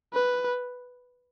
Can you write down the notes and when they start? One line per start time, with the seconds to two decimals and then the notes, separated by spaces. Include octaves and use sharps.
0.13 B4